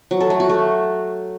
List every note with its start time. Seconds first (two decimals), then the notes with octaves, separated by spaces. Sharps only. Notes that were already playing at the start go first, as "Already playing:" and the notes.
0.11 F#3
0.21 A4
0.30 A3
0.40 F#4
0.49 A3